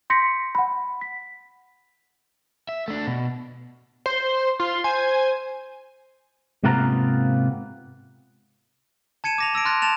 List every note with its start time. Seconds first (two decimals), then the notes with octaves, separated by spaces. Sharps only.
0.10 C6 G6 A#6 B6 C#7
0.55 F#5 B5
1.01 B6
2.69 E5
2.88 A3 D4
3.07 B2
4.06 C5 C6
4.60 F4 C6
4.84 C5 G#5
6.63 G#2 C3 A#3 B3 F4 A#5
9.24 A5 G#6 C#7 D#7 E7
9.38 D6 A#6 F7
9.53 A5 E6 A#6 D7
9.65 A5 C6 F6 F#6 A6 A#6
9.82 A5 A6 E7 F7